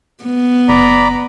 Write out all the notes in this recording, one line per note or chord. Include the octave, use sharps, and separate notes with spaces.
B3
F#1 D5 A#5 B5